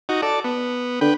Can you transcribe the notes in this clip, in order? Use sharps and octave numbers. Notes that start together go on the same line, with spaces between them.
D#4 F#4
A4 D5
B3
D3 B4 G5